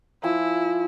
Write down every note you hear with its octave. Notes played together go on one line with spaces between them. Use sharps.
F3 E4 G#5